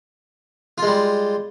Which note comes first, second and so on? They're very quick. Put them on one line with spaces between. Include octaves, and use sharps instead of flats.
F4 G#3 G3